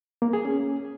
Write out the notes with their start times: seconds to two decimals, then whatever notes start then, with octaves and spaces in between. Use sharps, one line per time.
0.22 A#3
0.33 G#4
0.45 C#4